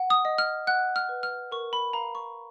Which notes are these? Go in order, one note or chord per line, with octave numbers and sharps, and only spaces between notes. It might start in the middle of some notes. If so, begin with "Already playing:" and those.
Already playing: F#5
D#6
D#5
F6
F#5 F#6
F6
B4
F6
A#4 C#6
B5
F5 A#5
C#6